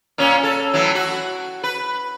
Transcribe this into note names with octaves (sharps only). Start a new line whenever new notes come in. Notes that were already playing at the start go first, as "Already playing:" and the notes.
A#2 C#4 C#5
A4
A2 E3 F#3
F#4
B4